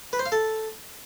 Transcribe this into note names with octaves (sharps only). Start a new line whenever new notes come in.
B4
C5
F5
A4